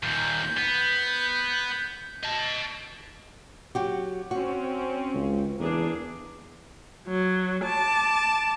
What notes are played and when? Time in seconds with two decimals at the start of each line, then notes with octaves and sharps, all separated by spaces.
0.03 D#2 A#2 G6
0.57 B3
2.23 D#5 A5
3.75 F#3 F#4 G4
4.31 C4 C#4 F#4
5.14 C#2
5.59 E2 A#3 D4 G#4
7.08 F#3
7.65 A5 D6